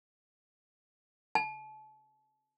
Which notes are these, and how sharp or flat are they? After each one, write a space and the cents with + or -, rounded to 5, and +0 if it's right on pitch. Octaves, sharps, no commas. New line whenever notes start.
A5 -35